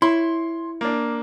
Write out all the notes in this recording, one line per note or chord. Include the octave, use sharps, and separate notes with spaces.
E4 C#5 C6
A#3 D4